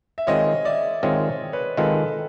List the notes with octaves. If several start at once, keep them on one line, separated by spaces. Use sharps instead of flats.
E5
D#3 G#3 C4 F4 C#5 D#5
D5 E5
D#3 G#3 C4 F4 C#5 D#5
B4 C#5
D#3 G#3 C4 F4 A4 B4